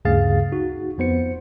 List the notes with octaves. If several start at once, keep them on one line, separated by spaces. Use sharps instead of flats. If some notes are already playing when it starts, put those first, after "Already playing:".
D2 G2 C#3 G#4 F5 A6
D#4 F#4
F2 B3 C5 C#7